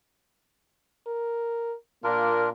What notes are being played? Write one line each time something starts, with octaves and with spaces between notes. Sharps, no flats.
A#4
A#2 A#3 D4 F4 A#4